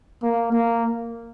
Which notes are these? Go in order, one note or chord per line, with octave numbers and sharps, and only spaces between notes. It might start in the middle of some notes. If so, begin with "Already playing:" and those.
A#3
A#3